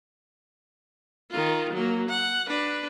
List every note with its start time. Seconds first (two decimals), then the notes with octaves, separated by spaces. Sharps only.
1.31 D#3 F4
1.73 F#3 A#3
2.09 F#5
2.47 D4 B4